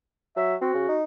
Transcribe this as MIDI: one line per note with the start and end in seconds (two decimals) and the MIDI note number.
0.37 0.56 54
0.37 0.55 76
0.61 0.72 60
0.61 0.97 66
0.74 0.84 49
0.89 1.04 63